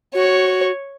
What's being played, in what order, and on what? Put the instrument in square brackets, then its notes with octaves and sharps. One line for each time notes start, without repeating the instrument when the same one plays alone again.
[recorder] F#4 [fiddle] C#5